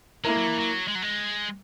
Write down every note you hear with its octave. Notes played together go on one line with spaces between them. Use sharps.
G#3 A#3 E4 A#4
F#3
E3
F#3
G#3
F#3
G#3